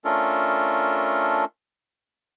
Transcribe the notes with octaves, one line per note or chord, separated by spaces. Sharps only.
A3 C#4 D4 F4 A4 A#4